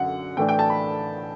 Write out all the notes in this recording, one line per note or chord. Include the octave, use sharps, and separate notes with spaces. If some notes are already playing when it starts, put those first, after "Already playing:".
Already playing: F#2 D3 F#3 F#5
A2 E3 A3 D4 G5
G5
A5
B5